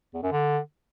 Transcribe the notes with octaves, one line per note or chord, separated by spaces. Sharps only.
E2
F#2
D3